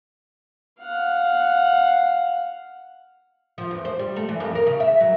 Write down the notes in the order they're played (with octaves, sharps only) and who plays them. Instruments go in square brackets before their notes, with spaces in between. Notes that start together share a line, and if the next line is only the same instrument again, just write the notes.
[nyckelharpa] F5 F#5
[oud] F3
E2
C5
G3
A3
E3
F2
A#4
C#3
E5
F#3